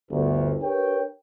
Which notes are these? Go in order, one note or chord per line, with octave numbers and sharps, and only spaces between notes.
G1 D2
D4 G4 A#4 B4 C#5 G5